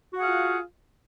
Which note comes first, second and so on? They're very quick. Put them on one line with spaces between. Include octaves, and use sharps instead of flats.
F#4 F#5 G#4 F5 F4